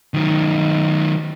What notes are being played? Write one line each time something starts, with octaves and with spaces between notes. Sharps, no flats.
D#3 F#3